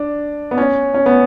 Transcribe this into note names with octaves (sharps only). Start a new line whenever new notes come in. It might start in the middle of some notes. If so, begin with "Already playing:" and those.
Already playing: D4
B3
C#4
C#4
B3